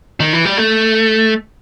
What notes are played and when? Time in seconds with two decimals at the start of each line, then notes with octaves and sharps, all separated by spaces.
0.20 D#3
0.33 E3
0.45 G3
0.57 A3